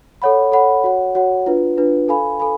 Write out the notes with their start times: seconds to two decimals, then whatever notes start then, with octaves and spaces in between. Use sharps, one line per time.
0.22 A4 C#5 F#5 B5
0.52 A4 C#5 F#5 B5
0.84 F#4 C#5 F#5
1.15 F#4 C#5 F#5
1.46 D4 F4 B4
1.77 D4 F4 B4
2.08 A4 F5 G#5 B5
2.40 A4 F5 G#5 B5